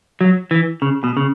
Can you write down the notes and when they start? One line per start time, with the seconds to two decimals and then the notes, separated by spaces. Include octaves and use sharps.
0.21 F#3
0.51 E3
0.82 C#3
1.04 B2
1.17 C#3